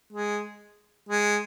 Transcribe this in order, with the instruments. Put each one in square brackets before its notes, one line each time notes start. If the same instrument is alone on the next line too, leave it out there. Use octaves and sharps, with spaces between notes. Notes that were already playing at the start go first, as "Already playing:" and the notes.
[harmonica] G#3
G#3